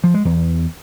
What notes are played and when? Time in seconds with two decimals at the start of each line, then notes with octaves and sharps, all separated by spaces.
0.04 F3
0.14 G#3
0.25 E2